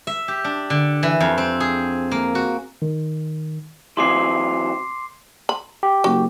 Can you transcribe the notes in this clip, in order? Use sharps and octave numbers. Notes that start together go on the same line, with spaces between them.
E5
G4
D4
D3
E3
F2
C4
G#4
A#3
F#4
D#3
E3 F#3 C4 C6 D6 C7
B5
G4
F#1 F#4